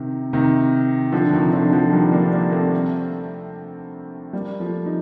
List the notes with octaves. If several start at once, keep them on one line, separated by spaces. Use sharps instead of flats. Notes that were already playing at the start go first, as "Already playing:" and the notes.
Already playing: C3 D#3
C3 D#3
D3 F3
C3 D#3
D3 F3
D3 F3
D#3 G3
A#3 D4
A#3 D4
A3 C4
G3 A#3
F3 A3
D#4